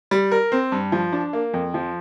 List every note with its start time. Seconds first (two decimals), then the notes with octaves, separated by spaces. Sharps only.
0.11 G3
0.32 A#4
0.52 C4
0.72 G2
0.92 F3
1.13 D4
1.33 A#3
1.54 F2
1.74 F3